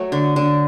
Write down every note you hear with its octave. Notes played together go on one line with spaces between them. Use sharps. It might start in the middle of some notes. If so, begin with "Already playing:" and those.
Already playing: F#3 A3
D3
D3